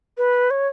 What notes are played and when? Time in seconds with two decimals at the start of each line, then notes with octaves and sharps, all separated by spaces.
0.18 B4
0.51 C#5